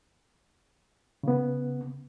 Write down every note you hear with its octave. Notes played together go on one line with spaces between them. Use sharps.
C#3 B3